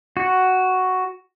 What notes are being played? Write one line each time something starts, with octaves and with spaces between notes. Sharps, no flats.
F#4